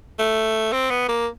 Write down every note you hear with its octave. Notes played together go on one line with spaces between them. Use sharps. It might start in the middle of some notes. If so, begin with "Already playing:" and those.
A3
C4
B3
A#3